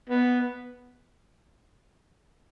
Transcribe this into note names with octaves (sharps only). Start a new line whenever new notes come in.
B3